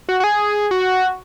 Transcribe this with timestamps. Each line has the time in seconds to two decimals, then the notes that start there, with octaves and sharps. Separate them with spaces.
0.09 F#4
0.20 F#4
0.24 G#4
0.71 F#4